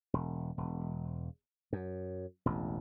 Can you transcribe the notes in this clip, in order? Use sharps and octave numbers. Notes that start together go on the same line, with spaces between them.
E1
E1
F#2
E1 A1